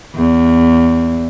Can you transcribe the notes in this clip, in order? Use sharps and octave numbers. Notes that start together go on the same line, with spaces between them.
E2